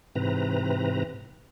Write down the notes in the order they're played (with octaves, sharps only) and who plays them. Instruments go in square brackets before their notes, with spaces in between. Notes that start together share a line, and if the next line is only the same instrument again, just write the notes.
[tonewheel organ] G#2 C3 E3 C4 B4 A#5